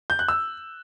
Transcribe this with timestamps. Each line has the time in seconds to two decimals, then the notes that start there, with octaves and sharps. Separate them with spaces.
0.10 G6
0.19 F#6
0.28 E6